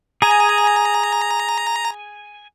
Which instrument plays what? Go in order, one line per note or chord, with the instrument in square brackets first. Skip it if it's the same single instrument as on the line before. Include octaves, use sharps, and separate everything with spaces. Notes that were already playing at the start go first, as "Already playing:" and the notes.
[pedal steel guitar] G#4 G#5 [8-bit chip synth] A#5